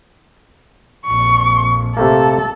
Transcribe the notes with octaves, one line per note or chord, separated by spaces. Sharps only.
A#1 F2 C#6
C3 A3 A#3 A4